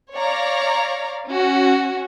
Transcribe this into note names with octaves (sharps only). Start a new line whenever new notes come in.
C#5 D5 F5 A#5
C#4 F#4